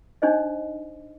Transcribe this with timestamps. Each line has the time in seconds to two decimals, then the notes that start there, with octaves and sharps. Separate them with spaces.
0.22 D4 D#4 C5 D#5